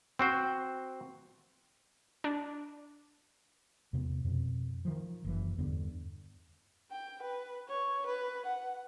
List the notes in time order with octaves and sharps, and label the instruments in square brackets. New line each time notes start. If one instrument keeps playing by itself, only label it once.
[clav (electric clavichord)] C4 F#4 C5
[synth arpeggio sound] D4
[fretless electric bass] E2 C3 A3 B3
F2 B2
D#3 F3
F#1 E3
E2 G2 D3 B3
[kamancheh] G5
B4
C#5
B4
F#5